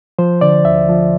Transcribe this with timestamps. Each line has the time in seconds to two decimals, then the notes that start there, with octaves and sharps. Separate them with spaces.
0.19 F3 C5
0.41 D3 D5
0.65 D2 E5
0.89 F3